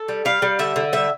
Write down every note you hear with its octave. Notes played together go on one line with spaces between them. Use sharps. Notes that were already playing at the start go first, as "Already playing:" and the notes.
Already playing: A4
G3
G3 F5
G3
D3 E5
D3
G3 E5